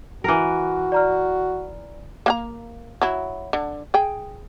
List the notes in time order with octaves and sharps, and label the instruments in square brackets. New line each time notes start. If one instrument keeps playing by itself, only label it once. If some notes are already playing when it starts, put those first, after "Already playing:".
[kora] E3 A#4 [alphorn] F#4
[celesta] D5 A#5 F6
[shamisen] A#3 F#5 A#5
F#3 E4
D3
G#4 G5